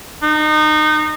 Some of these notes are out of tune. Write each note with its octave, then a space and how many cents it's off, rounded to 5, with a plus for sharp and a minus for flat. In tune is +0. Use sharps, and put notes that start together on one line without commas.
D#4 -25